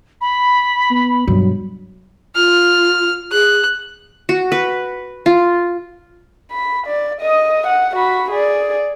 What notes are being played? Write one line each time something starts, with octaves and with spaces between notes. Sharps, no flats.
B5
B3
G2 B2 F#3
F4 F6
G#4 F#6
F#4
B4
F4
B5
D5
D#5 D#6
F#5
F#4 B5
G#4 D5